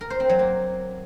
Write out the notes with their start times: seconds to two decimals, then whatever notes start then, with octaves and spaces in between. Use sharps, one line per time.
0.01 A#4
0.10 C5
0.20 C4
0.29 F#3
0.39 A#3